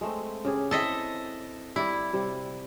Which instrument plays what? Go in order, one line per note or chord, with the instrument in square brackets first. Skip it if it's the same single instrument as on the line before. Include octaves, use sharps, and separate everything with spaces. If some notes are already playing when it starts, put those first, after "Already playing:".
[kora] G#3 A3 C4
C#3 G4 G#4
[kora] C4 E4 G5 [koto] A4 D#5 E5
[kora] G3 D5 [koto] E4
[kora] C3 G3